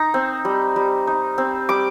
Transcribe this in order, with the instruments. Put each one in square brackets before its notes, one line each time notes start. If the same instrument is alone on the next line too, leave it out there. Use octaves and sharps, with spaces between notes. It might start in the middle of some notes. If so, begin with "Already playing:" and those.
Already playing: [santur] D#4 A#5
C4
G3
G3
D#4
C4
G3 D6